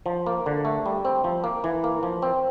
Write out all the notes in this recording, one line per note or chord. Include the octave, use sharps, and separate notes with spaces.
F3
A#3
D3
A3
G3
C4
F3
A#3
E3
A#3
F3
C4